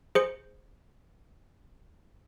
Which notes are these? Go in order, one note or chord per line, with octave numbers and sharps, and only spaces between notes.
G#4 C5 C#7